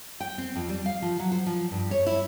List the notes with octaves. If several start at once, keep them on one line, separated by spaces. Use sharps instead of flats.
G5
C4
F2
G3
F5
F3
F#3
C5
F3
G2
C#5
E4